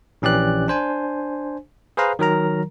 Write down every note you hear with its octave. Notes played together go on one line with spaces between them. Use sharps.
A#1 E3 C#4 G4 D5 F#6
D4 C5 G#5
G#4 B4 C5 F5 A#5
D#3 F#3 A#4 A#5